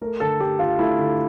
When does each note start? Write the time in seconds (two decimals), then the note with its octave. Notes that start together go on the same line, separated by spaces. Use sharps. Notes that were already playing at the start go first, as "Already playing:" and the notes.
0.01 A3 A#4
0.20 D3 A4
0.40 A3 G4
0.59 D3 F4
0.79 A3 E4
0.99 D3